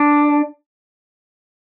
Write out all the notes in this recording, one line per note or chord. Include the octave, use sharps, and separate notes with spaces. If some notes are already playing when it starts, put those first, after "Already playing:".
Already playing: D4